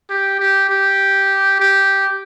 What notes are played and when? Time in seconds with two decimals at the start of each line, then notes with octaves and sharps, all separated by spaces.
0.10 G4
0.39 G4
0.69 G4
1.59 G4